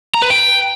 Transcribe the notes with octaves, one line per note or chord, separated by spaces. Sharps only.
A#5
B4
G5